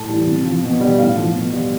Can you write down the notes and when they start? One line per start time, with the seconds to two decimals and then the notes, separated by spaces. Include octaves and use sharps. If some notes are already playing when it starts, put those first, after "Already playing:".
Already playing: A2 A5
0.09 E3 G3
0.27 C3
0.45 F3
0.63 B2
0.81 G3
0.99 A2 F5
1.16 F3
1.35 B2
1.52 G3